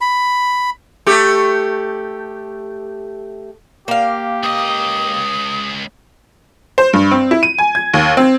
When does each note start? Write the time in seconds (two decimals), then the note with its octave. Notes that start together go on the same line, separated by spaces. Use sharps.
0.01 B5
1.06 A3 G4
3.88 A#3 G4 F5
4.43 C#2 D#5 D#6
6.78 C5
6.93 G2
7.11 C4
7.31 E4
7.43 D#7
7.59 G#5
7.75 G#6
7.94 D#2
8.17 C4